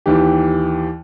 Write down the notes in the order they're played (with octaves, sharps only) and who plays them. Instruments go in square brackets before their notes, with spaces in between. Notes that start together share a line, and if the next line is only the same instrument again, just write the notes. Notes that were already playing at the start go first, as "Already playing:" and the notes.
[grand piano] D#2 E3 G4